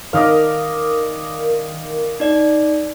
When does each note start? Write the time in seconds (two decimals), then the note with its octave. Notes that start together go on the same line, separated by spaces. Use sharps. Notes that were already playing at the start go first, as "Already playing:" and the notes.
0.13 D#3 A#4 D5 D#5 F5
2.20 D#4 D5